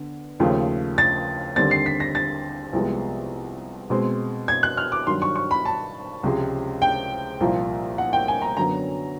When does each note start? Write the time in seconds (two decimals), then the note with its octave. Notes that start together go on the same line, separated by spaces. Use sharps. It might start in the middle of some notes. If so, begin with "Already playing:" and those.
Already playing: D3 B3
0.40 D#2 C#3 F3 A3
0.98 A6
1.56 D#2 D3 G3 C4 A6
1.71 C7
1.86 B6
2.00 A#6
2.15 A6
2.73 C2 C3 F3 G#3 B3
3.90 B2 G#3 C4
4.48 G#6
4.63 F#6
4.77 F6
4.92 D6
5.07 G2 D#3 F#3 C6
5.22 C#6
5.36 C#6
5.51 B5
5.65 A5
6.23 C#2 C3 F3 G#3
6.82 G5
7.41 C2 A#2 F3 A#3
7.98 F#5
8.13 G5
8.28 G#5
8.42 A#5
8.57 F#2 D3 F#3 B3 A#5